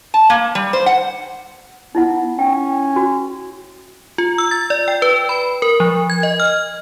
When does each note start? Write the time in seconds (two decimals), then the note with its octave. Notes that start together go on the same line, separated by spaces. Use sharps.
0.14 A5
0.30 A#3
0.55 G3
0.73 C5
0.86 F#5
1.95 B3 D#4 E4 F#5
2.39 C#4 G5
2.96 F#4
4.18 F4
4.38 E6
4.51 A6
4.70 D5
4.88 G5
5.02 B4
5.29 B5
5.62 A#4
5.80 F3
6.10 G#6
6.23 D#5
6.40 F6